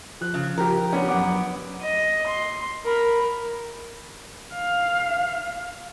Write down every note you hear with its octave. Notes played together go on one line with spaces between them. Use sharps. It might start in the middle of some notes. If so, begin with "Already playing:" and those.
F3 F#6
C#3
F3 G4 A#4
B3 C#4 D4 G4
F#2 F#5 D6
D#5
C6
A#4 B5
F5